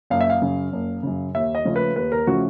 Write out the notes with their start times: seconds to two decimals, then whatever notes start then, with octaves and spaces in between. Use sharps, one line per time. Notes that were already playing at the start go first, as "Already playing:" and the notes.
0.10 F#1 F5
0.21 E5
0.30 F5
0.41 F#2 C#3
0.73 F#1
1.03 F#2 C#3
1.35 D#2 E5
1.55 D#5
1.65 C#3 F3 A3 C#4
1.76 B4
1.96 D#2 B4
2.12 A#4
2.27 C#3 F3 A3 C#4 F#4